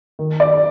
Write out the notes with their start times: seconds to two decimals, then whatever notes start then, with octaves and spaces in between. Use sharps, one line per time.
0.19 D#3
0.40 D5